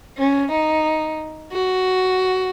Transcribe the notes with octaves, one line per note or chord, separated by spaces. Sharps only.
C#4
D#4
F#4